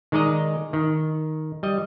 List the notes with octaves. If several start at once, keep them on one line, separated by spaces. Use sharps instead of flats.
D#3 G#3 D#4 D5 D#5 A#5
D#3
G3 D#5